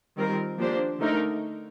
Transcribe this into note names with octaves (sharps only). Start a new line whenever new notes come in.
D#3 G3 C4 F4 A#4
F3 A#3 D4 G4 C5
D3 A3 D#4 A#4